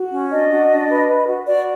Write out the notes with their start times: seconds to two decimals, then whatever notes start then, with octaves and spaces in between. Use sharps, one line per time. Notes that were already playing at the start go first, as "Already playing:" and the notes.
Already playing: F#4
0.11 C#4
0.31 D4 D#5
0.51 F#4
0.70 D4
0.89 B4
1.09 B4
1.27 F#4
1.47 F#4 D5